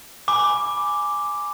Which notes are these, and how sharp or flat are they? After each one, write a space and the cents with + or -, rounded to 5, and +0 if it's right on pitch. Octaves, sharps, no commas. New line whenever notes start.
G#5 +0 B5 +0 D6 +0